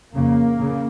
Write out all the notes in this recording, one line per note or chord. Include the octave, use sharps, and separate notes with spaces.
F2 C#3 A#3
C#3